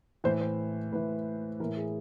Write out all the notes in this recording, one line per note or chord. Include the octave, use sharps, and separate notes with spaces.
A2 E3 C5
C5
A2 E3 B4
A2 E3 A#4
G#4